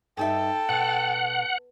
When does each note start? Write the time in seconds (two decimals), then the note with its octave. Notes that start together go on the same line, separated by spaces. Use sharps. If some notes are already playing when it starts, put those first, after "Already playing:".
0.17 G2 D#4 A4 E5 G5
0.69 B2 F#5